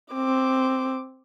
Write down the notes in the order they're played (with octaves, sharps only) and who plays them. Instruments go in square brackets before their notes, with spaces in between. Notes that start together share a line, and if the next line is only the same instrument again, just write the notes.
[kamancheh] C4 D6